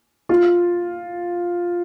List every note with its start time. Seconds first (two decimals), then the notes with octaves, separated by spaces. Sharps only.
0.29 F4